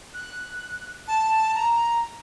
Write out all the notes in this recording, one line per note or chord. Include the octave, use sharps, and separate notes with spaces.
F#6
A5
A#5